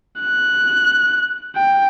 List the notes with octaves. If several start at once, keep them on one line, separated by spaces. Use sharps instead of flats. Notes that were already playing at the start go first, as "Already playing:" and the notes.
F#6
G5